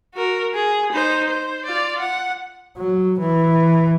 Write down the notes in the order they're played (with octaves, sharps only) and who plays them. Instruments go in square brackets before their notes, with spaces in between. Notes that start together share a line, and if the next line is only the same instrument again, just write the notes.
[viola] F#4 A#4
G#4
D#4 C5
C5
F4 D5
F#5
[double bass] F#3
E3